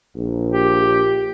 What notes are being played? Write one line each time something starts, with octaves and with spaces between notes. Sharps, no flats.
A#1
G4